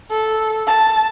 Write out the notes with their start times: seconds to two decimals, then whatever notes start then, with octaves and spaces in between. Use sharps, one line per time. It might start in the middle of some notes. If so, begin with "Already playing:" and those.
0.11 A4
0.67 A5